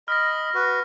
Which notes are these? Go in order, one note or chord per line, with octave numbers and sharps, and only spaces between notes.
D#5 B5 F6 A#6
F#4 B4